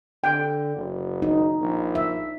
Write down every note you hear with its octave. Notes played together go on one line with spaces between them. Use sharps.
D3 G5
F#1
D#4
A#1
E5